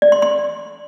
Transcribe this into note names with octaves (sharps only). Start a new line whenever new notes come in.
D5
C6
C6